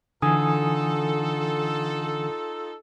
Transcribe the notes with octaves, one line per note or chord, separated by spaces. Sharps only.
D3 E3 D#4 F4 A4 G#5 D#6